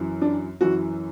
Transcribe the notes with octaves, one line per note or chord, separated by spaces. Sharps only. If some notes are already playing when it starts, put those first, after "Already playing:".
Already playing: F#2 E3
D4
F#2 E3 F#4